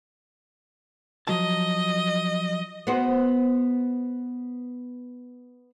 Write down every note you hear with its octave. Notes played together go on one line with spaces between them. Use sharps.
F3 F#3 D#5 A5
B3 F#4 C5